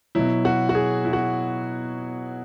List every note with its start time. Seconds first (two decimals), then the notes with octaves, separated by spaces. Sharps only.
0.15 B2 F#3 E4
0.45 F#4
0.69 F#4
0.75 G#4
1.05 E4
1.13 F#4